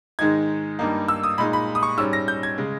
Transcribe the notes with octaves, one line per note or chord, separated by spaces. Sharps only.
G#2 D#3 G#3 D#4 G#6
G2 G3 A#3 D#4
E6
D#6
A#2 G#3 D#4 B5
B5
D#6
C#6
G#2 G3 C#4 E6
A#6
G6
G#6
C#3 G#3